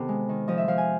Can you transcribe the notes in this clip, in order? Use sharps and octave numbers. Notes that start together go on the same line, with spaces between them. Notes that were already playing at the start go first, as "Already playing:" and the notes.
Already playing: C3 D#3 B3 A4
G#3
D#3
F3 D#5
E5
F3 F5
G#5